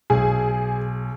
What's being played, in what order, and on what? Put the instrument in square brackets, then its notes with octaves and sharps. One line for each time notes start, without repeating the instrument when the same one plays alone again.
[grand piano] B1 [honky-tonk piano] G#4